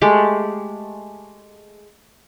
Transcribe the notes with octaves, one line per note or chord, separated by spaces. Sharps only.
G#3 A3 G4